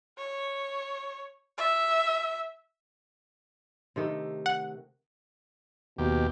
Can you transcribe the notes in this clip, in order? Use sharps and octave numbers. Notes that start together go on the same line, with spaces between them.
C#5
E5
C3 D#3 A3
F#5
D#2 B2 G4